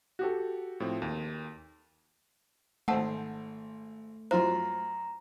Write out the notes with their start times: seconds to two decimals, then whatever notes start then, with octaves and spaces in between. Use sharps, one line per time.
0.19 F#4 G4 A4
0.80 A2 F3 C4
1.02 D#2
2.88 G#1 A3 C5 F#5 A5 E6
4.31 F#2 F4 C5 F5 A#5